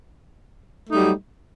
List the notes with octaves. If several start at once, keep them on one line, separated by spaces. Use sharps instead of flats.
F#3 G3 A3 D#4